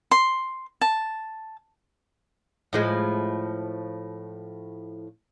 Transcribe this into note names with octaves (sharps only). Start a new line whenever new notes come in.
C6
A5
A2 F3 G#3